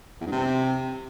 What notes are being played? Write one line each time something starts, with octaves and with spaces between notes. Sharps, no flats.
E2
G2
C3